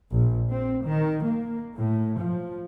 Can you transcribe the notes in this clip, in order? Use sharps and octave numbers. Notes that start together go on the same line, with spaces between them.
A#1
C4
D#3
A#3
A2
F3